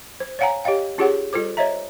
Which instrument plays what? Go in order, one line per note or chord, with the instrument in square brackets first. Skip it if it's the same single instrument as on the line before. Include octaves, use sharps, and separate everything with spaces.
[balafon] C5
C#5 D5 F5 F#5 G#5 A#5
G4 C#5 D#5 F5 G5
C#4 F4 G4 G#4 C#5 F#5
G3 F4 A4 C5 D6
C5 C#5 D#5 E5 A#5